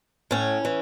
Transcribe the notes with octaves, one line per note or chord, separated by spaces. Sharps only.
A2 C#4
E3